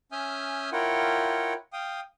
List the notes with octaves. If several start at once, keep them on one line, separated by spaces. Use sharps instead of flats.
C#4 E5 G#5 D#6 F6 G6
E4 F4 A#4 C#5 F#5 G5
F5 G5 D#6